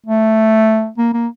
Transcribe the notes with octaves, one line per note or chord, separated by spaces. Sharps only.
A3
A#3
A#3